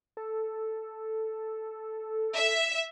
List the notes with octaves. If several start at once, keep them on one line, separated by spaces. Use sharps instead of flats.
A4
E5